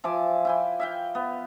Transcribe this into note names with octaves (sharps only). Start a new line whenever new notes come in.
F3 E5 G#5 D6
E4 G5 G#5
E5 F5 G5
B3